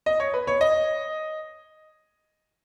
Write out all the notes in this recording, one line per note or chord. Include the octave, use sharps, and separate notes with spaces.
D#5
C#5
B4
C#5
D#5